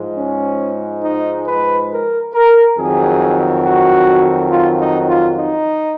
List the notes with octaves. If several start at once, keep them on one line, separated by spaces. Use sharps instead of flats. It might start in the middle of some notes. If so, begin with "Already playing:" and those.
Already playing: G#2 F3 G#3
C#4
D#4
B4
A#4
A#4
F2 D#3 F#3 G#4
F#4
F4
D#4
F4
D#4